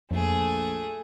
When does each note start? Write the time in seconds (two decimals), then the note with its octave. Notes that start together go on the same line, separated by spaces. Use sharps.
0.11 A#1 F2 A3 G#4